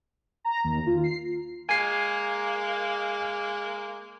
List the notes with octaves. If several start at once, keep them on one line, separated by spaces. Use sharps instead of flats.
A#5
D#2
F4
C7
G#3 A#3 G#5 C7